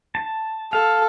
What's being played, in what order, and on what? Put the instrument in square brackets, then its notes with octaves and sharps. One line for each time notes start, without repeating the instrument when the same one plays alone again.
[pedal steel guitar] A5
[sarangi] A4 [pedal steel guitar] F5